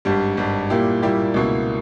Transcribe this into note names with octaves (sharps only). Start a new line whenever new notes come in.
G#1 G2 G3
G#1 G2 G3
A#2 G3 A#3 E4 G4
A#2 G3 A#3 E4 G4
C#2 B2 A#3 E4